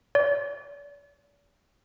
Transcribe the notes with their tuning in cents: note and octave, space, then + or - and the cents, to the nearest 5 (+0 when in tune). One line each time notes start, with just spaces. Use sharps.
D5 -45